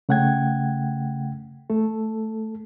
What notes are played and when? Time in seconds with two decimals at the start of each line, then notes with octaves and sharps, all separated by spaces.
0.09 C#3 A3 F#5 G5 G#6
1.70 A3 A4